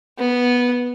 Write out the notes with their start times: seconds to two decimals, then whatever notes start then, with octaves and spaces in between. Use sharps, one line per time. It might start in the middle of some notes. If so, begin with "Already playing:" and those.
0.18 B3